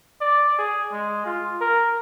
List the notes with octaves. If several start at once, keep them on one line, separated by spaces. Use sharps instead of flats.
D5
G#4
G#3
F4
A#4